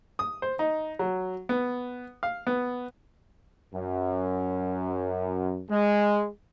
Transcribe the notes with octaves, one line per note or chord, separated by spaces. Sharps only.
D#6
C5
D#4
F#3
B3
F5
B3
F#2
G#3